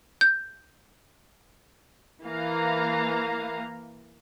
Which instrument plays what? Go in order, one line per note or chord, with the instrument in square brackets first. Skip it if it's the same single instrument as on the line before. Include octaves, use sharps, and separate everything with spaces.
[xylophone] G6
[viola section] E3 A#3 F5 A#5